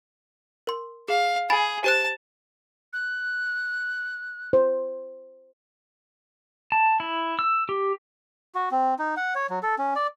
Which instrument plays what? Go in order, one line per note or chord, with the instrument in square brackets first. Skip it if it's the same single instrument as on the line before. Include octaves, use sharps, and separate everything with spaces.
[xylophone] A#4 C6
[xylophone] G#4 [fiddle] F5
[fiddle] G#4 [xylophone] G#5 B5 A6
[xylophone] G4 C5 F#6 [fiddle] A5
[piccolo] F#6
[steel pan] C5
[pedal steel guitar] A5
E4
E6
G4
[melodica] F#4
C4
D#4
F#5
C#5
F#3
A4
C#4
D5